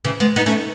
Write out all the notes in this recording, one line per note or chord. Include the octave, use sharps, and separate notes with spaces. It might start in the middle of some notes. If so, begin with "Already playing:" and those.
C#3 E3
G#3 B3
B3 D#4
A3 C#4